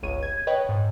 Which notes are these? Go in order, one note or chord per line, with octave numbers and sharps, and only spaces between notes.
G1 C#2 C#5 D#7
G#6
B4 C#5 D#5 G5
G#2